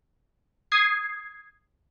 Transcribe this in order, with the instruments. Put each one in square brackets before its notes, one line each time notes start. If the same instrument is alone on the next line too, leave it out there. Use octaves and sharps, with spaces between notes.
[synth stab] D#6 G#6 C7